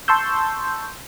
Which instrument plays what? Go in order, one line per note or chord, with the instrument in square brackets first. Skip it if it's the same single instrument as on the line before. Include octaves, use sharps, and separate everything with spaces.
[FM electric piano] A5 C6 C#6 E6 G6